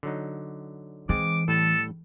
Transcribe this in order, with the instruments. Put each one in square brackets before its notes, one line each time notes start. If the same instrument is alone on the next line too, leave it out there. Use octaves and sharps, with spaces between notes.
[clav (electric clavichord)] D3 F#3 D#4
[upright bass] E3 [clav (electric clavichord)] G#3 C4 [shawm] D6
[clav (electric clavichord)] A2 G3 [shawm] A4